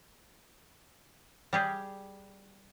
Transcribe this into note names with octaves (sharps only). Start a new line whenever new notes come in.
G3 G4 G#4